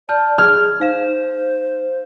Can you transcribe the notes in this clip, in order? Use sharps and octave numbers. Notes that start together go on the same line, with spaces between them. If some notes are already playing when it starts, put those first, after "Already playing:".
D5 A5 F6 G6
G#4 F6 G#6
D#4 C5 F5 E7